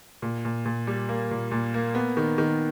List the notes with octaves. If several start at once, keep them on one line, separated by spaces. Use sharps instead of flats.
A#2
A#2
A#2
G3
A#3
A#2
A#2
A#3
B3
D#3
D#3